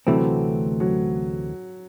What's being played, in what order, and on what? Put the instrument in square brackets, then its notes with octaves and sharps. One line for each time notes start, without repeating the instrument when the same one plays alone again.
[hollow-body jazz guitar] D2 C3 E3 A3 C4 [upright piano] F#3
[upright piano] F#3